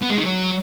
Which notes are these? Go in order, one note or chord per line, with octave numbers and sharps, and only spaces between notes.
B3
G#3
D#3
F#3